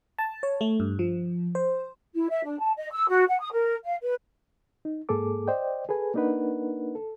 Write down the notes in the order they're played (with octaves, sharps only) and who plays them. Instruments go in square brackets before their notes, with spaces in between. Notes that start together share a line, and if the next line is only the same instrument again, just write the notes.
[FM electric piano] A5
C#5
A3
G2
F3
C5
[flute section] E4
E5
D4
A5
D#5
E6
F#4
F#5
D#6
A#4
F5
B4
[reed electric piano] D#4
G#2 A#3 G#4 A4 D6
C5 D5 D#5 G5
G#4 A4 B4 G#5
A#3 D4 D#4 A#4 B4 F#5
A4